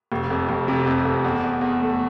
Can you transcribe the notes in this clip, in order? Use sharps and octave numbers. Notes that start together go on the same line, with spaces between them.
F1
F2
F1
C3
F2
F2
E2
E2
E2
A3